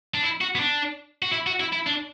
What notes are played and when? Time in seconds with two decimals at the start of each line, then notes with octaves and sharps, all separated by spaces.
0.15 D4
0.23 E4
0.41 F#4
0.55 B3
0.59 D4
1.22 F#4
1.32 E4
1.46 F#4
1.60 E4
1.72 E4
1.87 D4